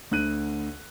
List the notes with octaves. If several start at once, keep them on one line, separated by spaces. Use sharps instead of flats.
D2 D3 F#6 D#7